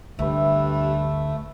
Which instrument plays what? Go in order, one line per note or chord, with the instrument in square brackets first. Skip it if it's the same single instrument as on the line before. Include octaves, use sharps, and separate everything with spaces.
[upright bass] D2 [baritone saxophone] G2 [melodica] A3 [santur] B4 E5